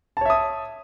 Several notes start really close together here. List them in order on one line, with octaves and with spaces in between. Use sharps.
A5 C#5 E5 D#6